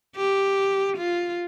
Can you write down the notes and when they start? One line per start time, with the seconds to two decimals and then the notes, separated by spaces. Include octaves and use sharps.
0.16 G4
0.97 F4